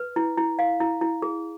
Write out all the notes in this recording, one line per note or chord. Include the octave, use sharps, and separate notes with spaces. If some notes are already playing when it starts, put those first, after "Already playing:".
Already playing: B4
E4
E4
F5
E4
E4
G#4